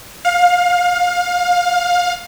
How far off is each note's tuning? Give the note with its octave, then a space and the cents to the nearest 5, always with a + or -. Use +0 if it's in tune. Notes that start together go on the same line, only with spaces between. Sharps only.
F5 +25